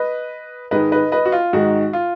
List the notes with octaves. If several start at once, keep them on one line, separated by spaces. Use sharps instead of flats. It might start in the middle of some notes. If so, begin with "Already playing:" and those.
Already playing: B4 D#5
G#2 D#3 G#3 B4 D#5
B4 D#5
B4 D#5
F#4
F4
G#2 D#3 G#3 F#4
F4